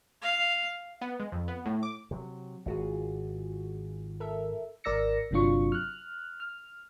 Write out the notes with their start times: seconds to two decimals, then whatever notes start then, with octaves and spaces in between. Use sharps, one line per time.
0.22 F5
1.01 B3
1.20 G#3
1.32 F2
1.48 B3
1.66 A2
1.83 D6
2.11 C3 F#3
2.66 G#1 F4 F#4 G#4
4.20 A4 A#4 E5
4.84 G#1 A#4 D5 E6 A#6 C#7
5.31 G1 C3 F#3 D4 F4 C#6
5.72 F6 F#6
6.40 F6